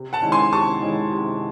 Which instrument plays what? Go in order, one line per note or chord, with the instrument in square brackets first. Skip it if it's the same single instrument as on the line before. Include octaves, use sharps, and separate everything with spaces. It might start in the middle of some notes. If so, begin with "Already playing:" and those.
Already playing: [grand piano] C3
[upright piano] F#5 A5
[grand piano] D#3 G#3 C#4 E4
[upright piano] G#5 C6
[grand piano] C3 [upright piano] A5 C#6
[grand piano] D#3 G#3 C#4 E4
C3